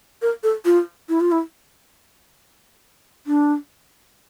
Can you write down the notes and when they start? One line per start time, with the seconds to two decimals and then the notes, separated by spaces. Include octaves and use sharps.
0.22 A#4
0.43 A4
0.65 F4
1.09 E4
1.21 F4
1.32 E4
3.27 D4